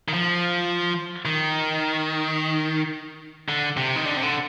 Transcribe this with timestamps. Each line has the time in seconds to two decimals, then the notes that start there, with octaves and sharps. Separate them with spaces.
0.08 D#3
0.14 F3
1.25 D#3
3.49 D3
3.77 C3
3.96 D#3
4.05 D3
4.17 C3
4.23 D3